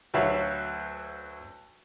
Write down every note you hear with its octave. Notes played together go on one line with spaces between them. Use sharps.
D2 F#3 F#4 B4 E5 F5